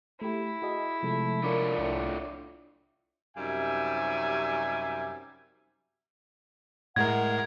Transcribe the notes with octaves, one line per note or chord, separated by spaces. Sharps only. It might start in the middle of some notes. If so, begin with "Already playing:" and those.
A3 E4 G4
F#4 G#4 D#5
C3 F3 G#3 A3
D4 F4 A#4 C#5
C2 A2
F#2 C3 G3 D#4 E5 G#5
A2 G#3 A#4 F#5 G#6